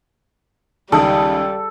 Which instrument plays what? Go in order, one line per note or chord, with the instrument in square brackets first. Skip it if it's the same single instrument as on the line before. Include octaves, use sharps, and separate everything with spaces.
[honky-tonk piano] C#2 D#3 D#6 [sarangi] G3 [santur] A4